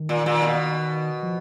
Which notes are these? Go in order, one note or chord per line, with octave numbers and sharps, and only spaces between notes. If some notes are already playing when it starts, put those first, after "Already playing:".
Already playing: D#3
A#2
A#2
B2
F3